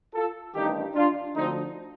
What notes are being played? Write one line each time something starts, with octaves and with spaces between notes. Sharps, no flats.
F4 A4
A1 G2 D#3 D#4 G4
D4 F4
D2 D3 F3 C4 D#4